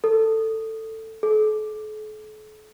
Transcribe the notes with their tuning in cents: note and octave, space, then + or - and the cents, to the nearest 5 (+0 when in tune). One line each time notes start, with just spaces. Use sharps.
A4 +15
A4 -45